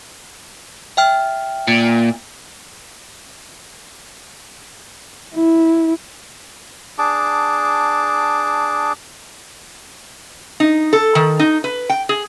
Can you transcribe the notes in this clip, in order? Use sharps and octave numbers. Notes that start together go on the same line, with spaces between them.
E5 G5 F6
A#2
E4
D4 G#4 A5 D6
D#4
A4
D#3
D#4
B4
G5
G#4